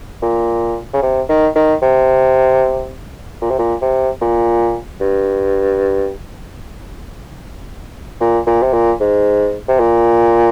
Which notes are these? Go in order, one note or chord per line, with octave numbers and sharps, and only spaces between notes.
A#2
C#3
C3
D#3
D#3
C3
A#2
C3
A#2
C3
A#2
G2
A#2
A#2
C3
A#2
G#2
C3
A#2